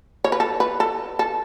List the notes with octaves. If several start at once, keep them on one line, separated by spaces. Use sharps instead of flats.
C#5
B4
A4
B4
A4
A4